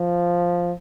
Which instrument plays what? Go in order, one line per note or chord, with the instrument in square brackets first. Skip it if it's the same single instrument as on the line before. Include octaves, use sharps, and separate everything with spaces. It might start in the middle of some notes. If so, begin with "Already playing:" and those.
Already playing: [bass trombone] F3